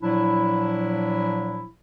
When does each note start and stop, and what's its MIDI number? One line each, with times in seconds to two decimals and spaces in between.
0.02 1.66 46
0.02 1.66 53
0.02 1.66 54
0.02 1.66 62
0.02 1.66 64